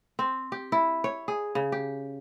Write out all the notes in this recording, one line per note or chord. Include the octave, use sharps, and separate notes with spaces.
C4
G4
E4
C#5
G#4
C#3
G4